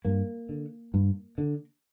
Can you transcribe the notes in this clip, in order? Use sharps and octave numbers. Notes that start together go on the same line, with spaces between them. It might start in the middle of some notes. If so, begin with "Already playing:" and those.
G2 A#3
D3
G2
D3